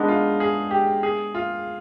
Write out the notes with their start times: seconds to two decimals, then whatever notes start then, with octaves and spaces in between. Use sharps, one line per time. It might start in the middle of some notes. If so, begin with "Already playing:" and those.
Already playing: G#3 B3 D4 D#4
0.08 F4
0.40 G#4
0.71 G4
1.03 G#4
1.35 F4